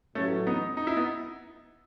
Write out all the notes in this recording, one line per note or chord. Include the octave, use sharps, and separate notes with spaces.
A1 A2 F#3 A3 C#4
B3 D#4
D#4
E4
B3 D#4